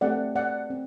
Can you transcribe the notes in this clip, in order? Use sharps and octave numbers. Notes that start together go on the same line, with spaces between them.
A3 C4 G4 D5 F#5
D5 F#5
C4